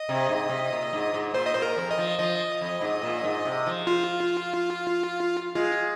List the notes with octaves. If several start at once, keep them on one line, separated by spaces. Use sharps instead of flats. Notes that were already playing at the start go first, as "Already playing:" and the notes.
Already playing: D#5
C3
G#2
C3
A#2
G#2
G#2
A#2 C5
D#5
A#2 C5
A#4
F2
D#5
F3
F3 D#5
F2
G#2
A#2
G#2
C3
F3
F4
G#3 F4